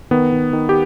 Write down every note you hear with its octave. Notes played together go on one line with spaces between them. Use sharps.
D#3 B3
D#3
D#3
G4